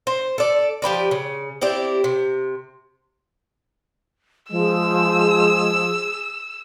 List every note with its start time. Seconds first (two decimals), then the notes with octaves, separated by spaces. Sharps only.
0.07 C5
0.38 A4 D5
0.82 F3 G4 B4 D5
1.11 C#3
1.61 C4 E4 G4 D5
2.04 C3
4.51 F3 G#3 G#4 E6